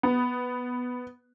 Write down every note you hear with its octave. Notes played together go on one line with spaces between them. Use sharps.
B3